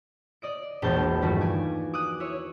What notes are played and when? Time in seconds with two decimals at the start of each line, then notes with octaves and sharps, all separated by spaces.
0.42 D5 D#5 D7
0.82 E1 A#1 D4 A5 G6
1.21 G2 D#3 F3 G3 A3 F#4
1.41 G#5 D6
1.94 D6 D#6 F#6
2.20 E4 C#5